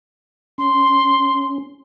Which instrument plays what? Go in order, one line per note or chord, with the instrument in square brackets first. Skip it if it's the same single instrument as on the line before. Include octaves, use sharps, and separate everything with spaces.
[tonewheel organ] C#4 [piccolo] C6